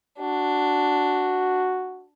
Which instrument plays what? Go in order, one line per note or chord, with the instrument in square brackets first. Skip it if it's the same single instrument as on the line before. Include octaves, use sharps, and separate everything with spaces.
[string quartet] D4 [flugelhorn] F#4